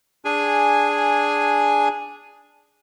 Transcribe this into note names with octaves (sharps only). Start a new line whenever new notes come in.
D4 G#4 G#5